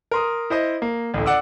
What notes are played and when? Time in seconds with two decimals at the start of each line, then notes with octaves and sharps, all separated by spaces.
0.11 A#4 C6 D#6
0.50 E4 C5 D#5
0.82 A#3
1.14 A1 D2
1.26 D5 F#5 D6 E6